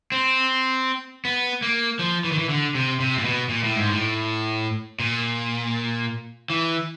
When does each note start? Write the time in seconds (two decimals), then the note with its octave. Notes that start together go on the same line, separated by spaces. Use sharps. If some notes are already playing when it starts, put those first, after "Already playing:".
0.12 C4
1.25 B3
1.62 A#3
1.99 F3
2.24 E3
2.32 D#3
2.39 E3
2.49 D3
2.75 C3
3.00 C3
3.18 A#2
3.25 B2
3.49 A#2
3.64 A2
3.76 G#2
3.90 A2
5.00 A#2
6.50 E3